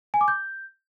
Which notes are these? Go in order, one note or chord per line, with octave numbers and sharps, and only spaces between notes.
G#5
D6
G6